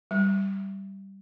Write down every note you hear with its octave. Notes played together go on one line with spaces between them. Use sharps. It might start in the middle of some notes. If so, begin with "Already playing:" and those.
G3